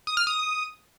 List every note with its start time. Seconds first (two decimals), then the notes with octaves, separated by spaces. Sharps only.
0.07 D#6
0.17 F6
0.27 D#6